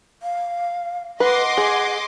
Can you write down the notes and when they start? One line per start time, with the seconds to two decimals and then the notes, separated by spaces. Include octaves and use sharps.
0.22 F5
1.20 B4 D#5 F#5 C6 D6
1.57 G#4